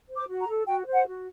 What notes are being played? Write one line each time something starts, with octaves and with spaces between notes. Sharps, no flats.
C5
D6
F#4
A#5
A4
F#4 G5
C5
F#5
F#4